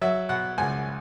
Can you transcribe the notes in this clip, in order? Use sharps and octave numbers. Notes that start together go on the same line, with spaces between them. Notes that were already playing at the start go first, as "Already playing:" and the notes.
F#3 E5
B2 F#5
C#2 G#5